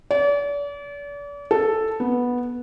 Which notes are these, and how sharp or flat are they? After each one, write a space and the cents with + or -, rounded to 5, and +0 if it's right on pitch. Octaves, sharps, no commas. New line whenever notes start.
D5 -40
A4 +0
B3 -10